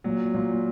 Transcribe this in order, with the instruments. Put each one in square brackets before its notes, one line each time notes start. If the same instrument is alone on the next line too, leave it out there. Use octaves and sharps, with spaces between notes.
[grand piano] A#2 F#3
A#2